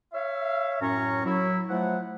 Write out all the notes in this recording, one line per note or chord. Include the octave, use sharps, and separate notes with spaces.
C#5 E5 F5
F#2 A2 C#4 C#5 A#5 C#6
F#3 E4
F3 F#3 A3 E4 F#5